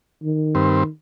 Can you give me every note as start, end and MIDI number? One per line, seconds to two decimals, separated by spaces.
0.23 0.87 51
0.55 0.84 43
0.55 0.84 60